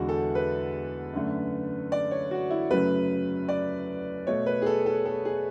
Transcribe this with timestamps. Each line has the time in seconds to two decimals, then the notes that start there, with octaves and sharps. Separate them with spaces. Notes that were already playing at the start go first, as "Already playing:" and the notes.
Already playing: E2 D3 G#3 E4 F#4
0.09 A4
0.35 B4
1.13 F#2 D3 A3
1.92 D5
2.11 C#5
2.31 F#4
2.50 E4
2.70 F#2 C#3 F#3 A3 B4
3.49 D5
4.27 B2 A3 C#5
4.46 B4
4.62 G#4
4.66 A4
4.86 A4
5.05 A4
5.25 G#4